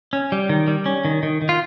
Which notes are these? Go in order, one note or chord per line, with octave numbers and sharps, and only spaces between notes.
C#4
G3
D#3
G3
C#4
D#3
D#3
D#3
F4